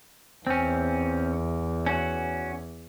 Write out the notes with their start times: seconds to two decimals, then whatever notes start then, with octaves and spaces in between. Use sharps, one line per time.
0.47 E2 C4 C#4
1.86 C#4 F#4